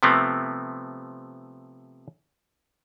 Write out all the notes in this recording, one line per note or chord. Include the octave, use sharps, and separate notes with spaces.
C3 F3 A3 B3 C4